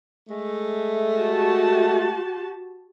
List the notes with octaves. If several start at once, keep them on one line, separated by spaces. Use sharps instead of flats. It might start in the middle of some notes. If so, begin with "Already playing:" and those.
G#3 A3
F#4 G4 A5